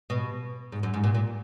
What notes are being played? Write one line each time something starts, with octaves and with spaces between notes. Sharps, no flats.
B2
G#2
F#2
G#2
A#2
A#2